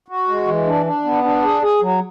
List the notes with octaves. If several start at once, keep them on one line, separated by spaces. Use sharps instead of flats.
F#4
G#3
E3
D4
D4
B3
D4
G#4
G#4
F#3